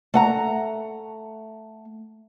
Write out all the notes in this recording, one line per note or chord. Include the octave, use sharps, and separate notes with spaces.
A3 F#5 A#5